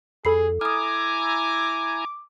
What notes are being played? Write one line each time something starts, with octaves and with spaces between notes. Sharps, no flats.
F2 G#4 A4 B5 C7
E4 G#5 A#5 D6 D#6 F6